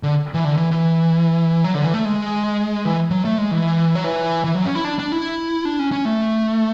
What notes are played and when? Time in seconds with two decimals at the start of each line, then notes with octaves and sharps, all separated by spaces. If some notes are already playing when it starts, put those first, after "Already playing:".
0.03 D3
0.34 E3
0.45 D3
0.57 E3
0.71 E3
1.64 F#3
1.75 D3
1.84 E3
1.94 A3
2.05 G#3
2.85 E3
3.11 F#3
3.25 A3
3.38 G#3
3.51 E3
3.95 F#3
4.04 E3
4.44 E3
4.55 F#3
4.65 C#4
4.75 E4
4.84 D4
4.99 D4
5.12 E4
5.65 D4
5.79 C#4
5.92 C#4
6.05 A3